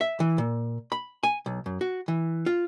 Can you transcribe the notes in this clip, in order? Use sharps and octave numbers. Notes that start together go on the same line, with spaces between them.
E5
E3
A#2
B5
G#5
B1
F#2
F#4
E3
F4